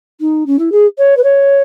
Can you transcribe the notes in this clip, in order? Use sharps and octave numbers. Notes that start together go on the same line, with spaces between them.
D#4
C#4
E4
G#4
C#5
B4
C#5